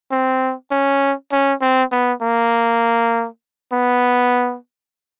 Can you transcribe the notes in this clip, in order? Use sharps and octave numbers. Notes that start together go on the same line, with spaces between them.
C4
C#4
C#4
C4
B3
A#3
B3